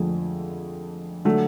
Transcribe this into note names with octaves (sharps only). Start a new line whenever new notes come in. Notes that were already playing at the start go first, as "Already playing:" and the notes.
Already playing: F2 D3 F3 G#3 A3 G#4
D3 F#3 A3